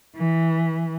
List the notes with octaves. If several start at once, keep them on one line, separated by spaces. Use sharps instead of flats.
E3